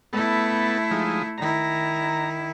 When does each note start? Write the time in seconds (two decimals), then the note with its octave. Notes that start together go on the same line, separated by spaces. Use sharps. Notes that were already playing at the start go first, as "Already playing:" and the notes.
0.13 A3 B3 E4 A4
0.91 F3 G#3 D#4
1.38 D#3 E4 A#5